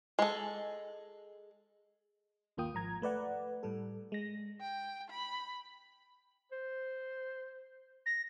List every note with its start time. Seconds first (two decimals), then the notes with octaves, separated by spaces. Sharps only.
0.19 G#3 A4
2.57 G1 D#2 A#3 F4 G5 D#6
2.73 G#1 G#2 F3 A#5 G#6
3.02 A3 B4 D5 F#5
3.63 A2 G3 A4
4.12 G#3 A#6
4.61 G5
5.10 B5
6.52 C5
8.06 A#6